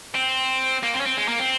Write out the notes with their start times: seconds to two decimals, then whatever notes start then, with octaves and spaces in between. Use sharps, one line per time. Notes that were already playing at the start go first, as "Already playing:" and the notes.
0.15 C4
0.83 A#3
0.94 C4
1.00 C#4
1.06 C4
1.18 G#3
1.29 A#3
1.40 C4